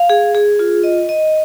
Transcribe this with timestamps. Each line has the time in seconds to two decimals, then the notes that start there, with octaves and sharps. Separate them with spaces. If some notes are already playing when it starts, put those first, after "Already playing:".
Already playing: F5
0.10 G#4
0.35 G#4
0.59 F4
0.83 D#5
1.09 D#5